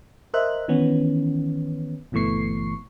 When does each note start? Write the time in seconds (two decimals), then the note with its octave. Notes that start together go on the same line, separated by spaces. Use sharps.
0.34 A#4 C5 D#5 E5 F#6
0.68 D#3 E3 B3 C#4
2.12 G1 B2 E3 A3 C#6 C7